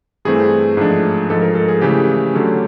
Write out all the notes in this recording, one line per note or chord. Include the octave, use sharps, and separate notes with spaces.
G2 E3 A3 C4 G#4
G#2 F3 A3 D4
G#2 F3 G#3 A4
A#4
A4
G#4
C#3 E3 A3 G4
D3 F#3 A3 C#4